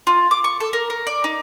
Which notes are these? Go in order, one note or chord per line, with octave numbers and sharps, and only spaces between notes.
F4
D6
C#6
A4
A#4
A#4
D5
D#4